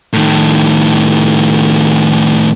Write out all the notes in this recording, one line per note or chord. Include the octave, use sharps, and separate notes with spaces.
A2 D#3